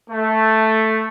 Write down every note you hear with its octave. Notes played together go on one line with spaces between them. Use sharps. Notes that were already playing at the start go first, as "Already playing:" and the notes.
A3